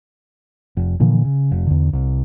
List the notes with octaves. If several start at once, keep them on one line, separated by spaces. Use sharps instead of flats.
F1
A#2 D3 E3 F3
C#3
F1
E2 D3
C2